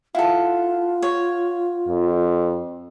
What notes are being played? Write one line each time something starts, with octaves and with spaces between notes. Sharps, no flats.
E4 F4 A4 F5 F#5
C#5
F2